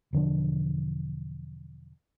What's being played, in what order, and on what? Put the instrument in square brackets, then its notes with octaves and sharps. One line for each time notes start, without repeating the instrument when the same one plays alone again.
[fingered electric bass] E1 D3 F3 D4